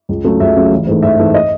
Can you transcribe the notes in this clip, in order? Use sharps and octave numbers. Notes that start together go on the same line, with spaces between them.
C#2
C#3 F#3 A3
C#2 E5
C#3 F#3 A3
A1
G#2 E3 A3
A1 E5
G#2 E3 A3
D#5